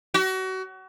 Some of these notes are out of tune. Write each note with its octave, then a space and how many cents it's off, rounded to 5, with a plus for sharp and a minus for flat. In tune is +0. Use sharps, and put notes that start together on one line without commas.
F#4 +30